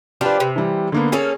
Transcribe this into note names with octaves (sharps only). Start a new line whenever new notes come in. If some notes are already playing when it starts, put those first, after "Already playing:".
F3 D4 F4 G4 B4
C3
E3 G3
D3 A#3 B3
A#3 C#4 G#4 A4